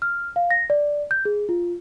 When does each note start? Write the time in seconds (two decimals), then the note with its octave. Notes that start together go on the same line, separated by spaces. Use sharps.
0.02 F6
0.36 F5
0.51 A#6
0.70 D5
1.11 G6
1.25 G#4
1.49 F4